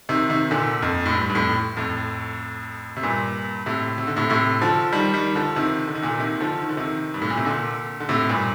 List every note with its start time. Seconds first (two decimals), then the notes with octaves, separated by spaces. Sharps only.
0.09 C3 D#3
0.30 C3 D#3
0.51 A#2 D3
0.82 F2
1.06 A2
1.14 G2
1.29 G2
1.35 F2 A2
1.77 F2 A2
2.97 C3
3.03 G2 A#2
3.66 A2 C3
3.98 C3
4.07 D3
4.16 A2 C3
4.30 A2 C3
4.61 D3 F3
4.92 D#3 G3
5.14 D#3 G3
5.35 D3 F3
5.56 C3 D#3
5.87 D3
5.95 D#3
6.03 A#2 D3
6.19 C3 D#3
6.36 D#3
6.40 D3 F3
6.62 D#3
6.69 D3
6.77 C3 D#3
7.14 G2
7.22 A2
7.30 A#2
7.37 C3
7.45 A#2 D3
8.00 D3
8.09 A2 C3
8.29 G2 A#2